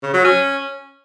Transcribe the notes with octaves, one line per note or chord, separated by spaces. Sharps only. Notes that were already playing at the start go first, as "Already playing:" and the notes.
C#3
F#3
C#4